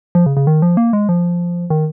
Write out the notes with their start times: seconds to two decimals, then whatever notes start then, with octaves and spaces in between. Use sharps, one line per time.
0.15 F3
0.26 C#3
0.37 C#3
0.47 D#3
0.62 F3
0.77 A#3
0.93 G#3
1.09 F3
1.70 D#3